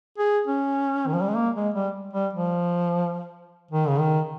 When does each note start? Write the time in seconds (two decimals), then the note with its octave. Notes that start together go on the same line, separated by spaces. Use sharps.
0.18 G#4
0.47 C#4
1.07 D#3
1.14 F3
1.21 G3
1.28 G#3
1.36 A#3
1.55 G#3
1.74 G3
2.13 G3
2.33 F3
3.71 D#3
3.88 C#3
4.00 D#3